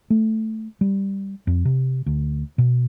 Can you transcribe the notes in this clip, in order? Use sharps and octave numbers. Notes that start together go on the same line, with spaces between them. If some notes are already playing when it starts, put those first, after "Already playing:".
A3
G3
F2
C3
D2
B2